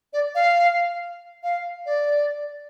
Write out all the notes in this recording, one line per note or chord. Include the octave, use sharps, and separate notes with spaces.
D5
F5
F5
D5